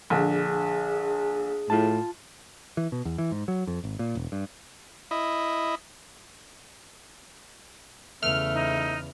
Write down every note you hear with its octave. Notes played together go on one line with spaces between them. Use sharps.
A#1 D3 G#4
A2 F4 A5
E3
B2
E2
E3
G#2
F#3
F2
G#1
A#2
E1
G2
E4 D#5
E2 C#3 A3 F6
D#4